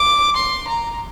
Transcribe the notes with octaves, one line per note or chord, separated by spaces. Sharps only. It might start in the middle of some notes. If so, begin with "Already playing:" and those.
Already playing: D6
C6
A#5